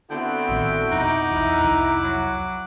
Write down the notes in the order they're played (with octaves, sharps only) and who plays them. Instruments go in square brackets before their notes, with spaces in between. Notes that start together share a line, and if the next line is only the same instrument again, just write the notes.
[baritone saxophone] D3 [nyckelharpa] B3 C4 [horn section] E4 F#4 G5
[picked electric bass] A#1 A2 D#3
[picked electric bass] F2 B2 [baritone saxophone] D#4 [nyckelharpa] F#5 D6
[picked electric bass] A#1 E2 [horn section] E4
[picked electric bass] C2 F2
[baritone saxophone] F#3